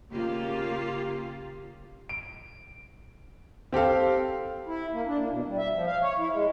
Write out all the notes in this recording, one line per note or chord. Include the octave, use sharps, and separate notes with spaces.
C#3 A#3 F4 G4
D7
C4 G4 A4 F5
E4
A#3
D4
A#3
B2
G3
E5
F3
F5
C#5
E4
G#3